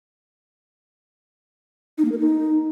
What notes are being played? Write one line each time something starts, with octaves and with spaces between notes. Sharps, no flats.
D#4
A#3
A#4
D#4